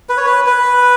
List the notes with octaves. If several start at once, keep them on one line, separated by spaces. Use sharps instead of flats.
B4
C#5
B4
B4